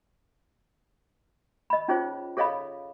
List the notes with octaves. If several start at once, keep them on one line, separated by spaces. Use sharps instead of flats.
D#5 B5
C#4 D#4 F4 G#4 C5 C#5
G#4 A4 C#5 D#5 F5 B5